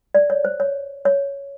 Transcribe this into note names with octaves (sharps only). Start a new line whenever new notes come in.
D5
C#5
C5
C#5
C#5